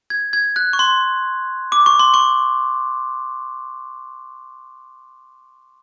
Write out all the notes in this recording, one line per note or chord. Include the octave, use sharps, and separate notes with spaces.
G#6
G#6
F#6
C#6
C6
D6
C#6
C6
C#6